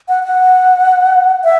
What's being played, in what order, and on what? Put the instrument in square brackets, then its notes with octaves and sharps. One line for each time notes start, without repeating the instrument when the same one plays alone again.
[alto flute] F#5
F#5
E5